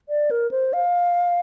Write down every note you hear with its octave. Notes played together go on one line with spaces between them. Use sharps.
D5
A#4
C5
F5